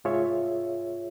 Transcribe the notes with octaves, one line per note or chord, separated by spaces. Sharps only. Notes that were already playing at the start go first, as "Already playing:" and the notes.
C2 G#2 F4 G#4 C#5 E5